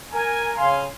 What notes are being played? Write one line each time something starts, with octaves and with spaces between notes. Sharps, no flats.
A#4 G#5
C#3 F5 G#5 C6